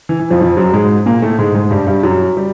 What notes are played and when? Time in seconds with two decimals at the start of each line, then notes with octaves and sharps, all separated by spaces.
0.09 E3
0.19 E3
0.30 F2 F3
0.41 F2 F3
0.57 F#2 F#3
0.73 G#2 G#3
1.06 A#2 A#3
1.22 A2 A3
1.38 G#2 G#3
1.55 G#2 G#3
1.71 G2 G3
1.87 G2 G3
2.03 F#2 F#3
2.37 G3